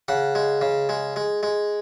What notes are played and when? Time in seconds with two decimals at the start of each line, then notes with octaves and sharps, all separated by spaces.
0.08 C#3 F#5
0.35 G#3
0.61 C#3
0.89 G#3
1.16 G#3
1.43 G#3